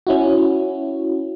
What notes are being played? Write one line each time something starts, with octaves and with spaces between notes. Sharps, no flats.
C#4 E4 F#4